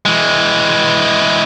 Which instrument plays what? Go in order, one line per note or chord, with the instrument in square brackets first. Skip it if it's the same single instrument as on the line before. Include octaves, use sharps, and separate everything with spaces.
[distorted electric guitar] E3 G#3